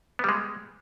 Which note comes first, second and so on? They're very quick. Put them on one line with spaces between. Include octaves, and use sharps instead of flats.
B3 G3 G#3